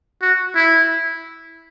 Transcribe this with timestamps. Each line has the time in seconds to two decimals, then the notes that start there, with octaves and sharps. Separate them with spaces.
0.22 F#4
0.56 E4